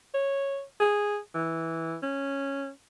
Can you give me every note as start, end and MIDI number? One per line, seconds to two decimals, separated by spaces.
0.14 0.62 73
0.80 1.19 68
1.34 1.96 52
2.02 2.69 61